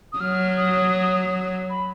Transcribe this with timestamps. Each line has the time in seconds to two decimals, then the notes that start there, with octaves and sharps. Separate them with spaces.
0.12 D#6
0.19 F#3 F6
0.57 D#6
1.70 B5